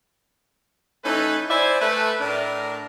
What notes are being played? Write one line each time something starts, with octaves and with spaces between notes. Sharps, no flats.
E3 A3 C#4 D#4 A4 B4
E4 C5 D5 E5 G#5
A3 B4
A2 D4 A#4